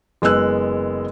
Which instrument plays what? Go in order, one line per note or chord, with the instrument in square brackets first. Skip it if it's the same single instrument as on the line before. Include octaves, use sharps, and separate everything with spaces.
[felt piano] F#1 G#3 B3 E6 F#6